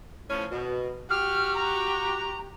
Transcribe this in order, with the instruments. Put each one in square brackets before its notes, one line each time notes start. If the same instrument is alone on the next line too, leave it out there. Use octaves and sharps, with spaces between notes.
[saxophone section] A2 F3 C#4
B2
[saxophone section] F#4 G4 [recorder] F6
[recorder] A#5